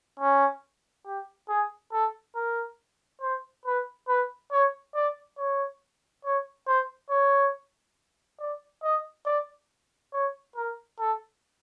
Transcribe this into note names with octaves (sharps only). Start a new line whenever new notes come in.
C#4
G4
G#4
A4
A#4
C5
B4
B4
C#5
D5
C#5
C#5
C5
C#5
D5
D#5
D5
C#5
A#4
A4